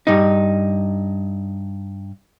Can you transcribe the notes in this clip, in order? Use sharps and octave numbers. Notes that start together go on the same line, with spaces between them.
G2 D#4